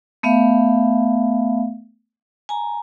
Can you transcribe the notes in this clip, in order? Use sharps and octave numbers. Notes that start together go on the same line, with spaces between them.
A3 B3 E5 F5
G#5 A#5